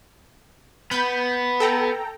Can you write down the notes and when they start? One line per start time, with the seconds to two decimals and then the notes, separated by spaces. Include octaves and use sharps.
0.91 B3 B5 G6
1.60 A4 G5 A#5